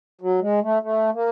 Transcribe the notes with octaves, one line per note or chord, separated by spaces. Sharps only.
F#3
G#3
A3
A3
A#3